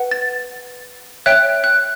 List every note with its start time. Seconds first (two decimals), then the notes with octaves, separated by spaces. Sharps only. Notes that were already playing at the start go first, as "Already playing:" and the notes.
Already playing: B4 F#5
0.11 A6
1.26 C#5 E5 G5 F#6
1.64 F#6